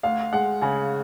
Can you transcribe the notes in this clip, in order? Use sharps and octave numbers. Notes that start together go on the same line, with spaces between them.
D2 F5
G#3 F#5
C#3 G#5